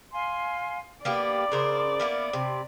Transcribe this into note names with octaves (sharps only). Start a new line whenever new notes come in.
F5 G#5 C6
A#3 B3 G4 D5 B5 D6
C#3 A#4 C5
A#3 B3 E4
C3